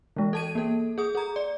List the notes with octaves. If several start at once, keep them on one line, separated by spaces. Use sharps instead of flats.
E3 G#3
A4 A5 D#7
A#3 A4
G#4 D#6
G#4 A#5
D5